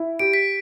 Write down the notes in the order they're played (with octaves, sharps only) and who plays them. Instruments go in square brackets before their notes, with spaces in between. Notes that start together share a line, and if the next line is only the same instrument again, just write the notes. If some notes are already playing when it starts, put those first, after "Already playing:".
Already playing: [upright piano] E4
[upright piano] G4 [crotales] D7
[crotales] B6